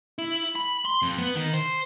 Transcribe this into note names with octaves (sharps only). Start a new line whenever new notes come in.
E4
B5
C6
F2
B3
D#3
C5